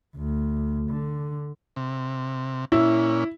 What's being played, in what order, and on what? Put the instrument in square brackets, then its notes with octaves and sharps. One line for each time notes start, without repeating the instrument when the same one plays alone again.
[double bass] D2
D3
[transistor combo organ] C3
[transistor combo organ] A#2 C#4 [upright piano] E4